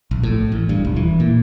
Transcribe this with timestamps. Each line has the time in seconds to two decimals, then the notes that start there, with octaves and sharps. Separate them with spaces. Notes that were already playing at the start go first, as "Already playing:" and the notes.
0.11 A#1
0.23 A2
0.52 A1
0.69 G2
0.85 E1
0.96 E3
1.20 A#2